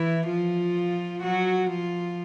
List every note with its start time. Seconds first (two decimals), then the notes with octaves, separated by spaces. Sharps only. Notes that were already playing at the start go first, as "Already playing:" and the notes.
Already playing: E3 E4
0.28 F3 F4
1.23 F#3 F#4
1.70 F3 F4